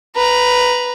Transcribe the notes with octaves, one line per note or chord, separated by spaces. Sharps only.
B4 A#5